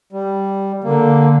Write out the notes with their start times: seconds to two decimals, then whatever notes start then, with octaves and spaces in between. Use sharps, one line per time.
0.12 G3
0.84 D3 A#3